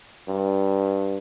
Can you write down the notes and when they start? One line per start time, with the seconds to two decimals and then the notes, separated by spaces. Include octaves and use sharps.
0.28 G2